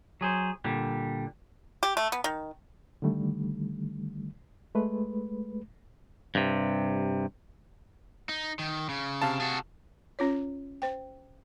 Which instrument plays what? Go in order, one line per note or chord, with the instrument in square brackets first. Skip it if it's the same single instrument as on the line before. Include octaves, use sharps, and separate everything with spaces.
[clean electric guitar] F#3 G#4 C5
A#2 D3 G3
[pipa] G4
A3
B3
D#3
[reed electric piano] D3 D#3 G3 A3
G#3 A3 B4
[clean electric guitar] G2 C3
[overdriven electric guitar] D#4
D#3
C#3
[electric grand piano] C3 F5 A5
[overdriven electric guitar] F#4 G#4
[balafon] C#4 F4 C#5
C5 G5